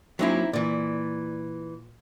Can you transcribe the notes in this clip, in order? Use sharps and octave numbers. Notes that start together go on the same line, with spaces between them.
F#3 A#3 C4 C#4 D#4 E4
A#2 E3 D5